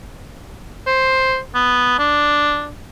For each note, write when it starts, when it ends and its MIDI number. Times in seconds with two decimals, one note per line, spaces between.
0.87 1.39 72
1.55 1.97 59
1.99 2.70 62